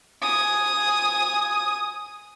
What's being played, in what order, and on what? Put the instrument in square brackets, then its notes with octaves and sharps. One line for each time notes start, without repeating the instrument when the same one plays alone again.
[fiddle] G#5 D#6